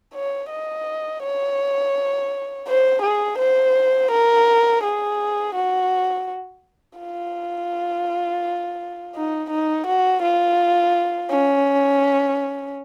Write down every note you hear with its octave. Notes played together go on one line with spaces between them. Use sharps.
C#5
D#5
C#5
C5
G#4
C5
A#4
G#4
F#4
F4
D#4
D#4
F#4
F4
C#4